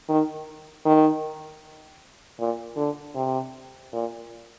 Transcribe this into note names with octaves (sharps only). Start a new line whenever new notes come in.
D#3
D#3
A#2
D3
C3
A#2